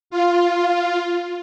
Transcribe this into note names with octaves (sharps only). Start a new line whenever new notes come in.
F4